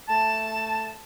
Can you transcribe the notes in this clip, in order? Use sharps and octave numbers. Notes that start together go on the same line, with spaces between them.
A3 A5